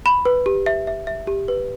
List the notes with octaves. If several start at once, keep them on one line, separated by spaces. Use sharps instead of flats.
B5
B4
G4
E5
E5
E5
G4
B4